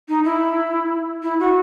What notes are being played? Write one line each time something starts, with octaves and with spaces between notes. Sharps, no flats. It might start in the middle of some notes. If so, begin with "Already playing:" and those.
D#4
E4
E4
F#4